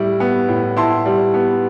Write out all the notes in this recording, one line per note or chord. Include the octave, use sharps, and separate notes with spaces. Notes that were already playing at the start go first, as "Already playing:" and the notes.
Already playing: A2 G3 E4
B3
A2
E4 A5 C6
G3
B3